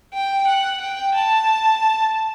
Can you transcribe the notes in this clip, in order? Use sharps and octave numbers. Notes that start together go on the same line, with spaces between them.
G5
F#5
G5
A5